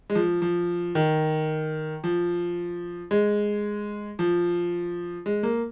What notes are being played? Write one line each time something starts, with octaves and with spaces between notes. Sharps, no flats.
G#3
F3
F3
D#3
F3
G#3
F3
G#3
A#3